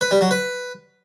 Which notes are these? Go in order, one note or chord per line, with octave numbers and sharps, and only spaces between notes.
B4
G3
F#3
B4